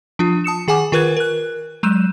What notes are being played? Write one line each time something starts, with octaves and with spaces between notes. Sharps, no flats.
F3 D4 F4
A5 D#6 C#7 E7
D#3 G#4 F#5 G#5 D6 E7
D#3 F4 A#4 B4 F#6 G#6
A#4 F#6
F#3 G#3 G6 D#7 E7